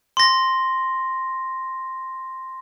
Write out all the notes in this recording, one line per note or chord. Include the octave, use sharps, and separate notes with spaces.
C6 A#6